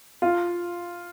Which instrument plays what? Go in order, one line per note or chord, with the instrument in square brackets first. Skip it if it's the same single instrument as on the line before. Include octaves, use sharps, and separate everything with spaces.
[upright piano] F4